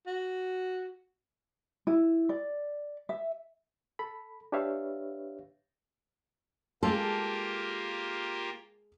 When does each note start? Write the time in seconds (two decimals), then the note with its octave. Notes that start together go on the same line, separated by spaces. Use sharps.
0.07 F#4
1.87 E4
2.29 D5
3.09 E5
3.99 A4 B5
4.52 D4 G4 B4 C#5 E5 F5
6.83 G#3 A#3 F4 G4 A4 F5 C6